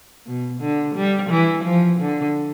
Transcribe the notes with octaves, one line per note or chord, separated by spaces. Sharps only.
B2
D3
G3
E3
F3
D3